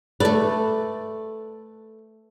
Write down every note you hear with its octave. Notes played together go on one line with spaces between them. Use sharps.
A3 A4 B4 D5